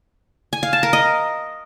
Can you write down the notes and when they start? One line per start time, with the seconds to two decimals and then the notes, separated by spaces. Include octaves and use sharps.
0.53 G#5
0.63 F5
0.73 A5
0.83 A#4
0.93 D#5